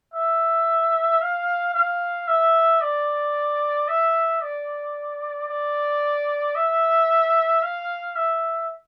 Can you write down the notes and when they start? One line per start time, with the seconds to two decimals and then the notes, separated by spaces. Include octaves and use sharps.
0.14 E5
1.21 F5
1.75 F5
2.28 E5
2.82 D5
3.88 E5
4.42 D5
5.49 D5
6.56 E5
7.62 F5
8.16 E5